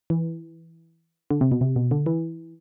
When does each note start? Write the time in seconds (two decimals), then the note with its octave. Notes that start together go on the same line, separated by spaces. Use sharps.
0.10 E3
1.31 D3
1.41 C3
1.52 B2
1.61 C3
1.76 B2
1.91 D3
2.06 E3